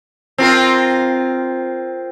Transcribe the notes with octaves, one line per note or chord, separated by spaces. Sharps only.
C4 F4 A#4